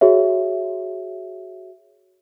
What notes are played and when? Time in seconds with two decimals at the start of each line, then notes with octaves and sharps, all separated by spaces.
0.01 F#4 G#4 C#5 E5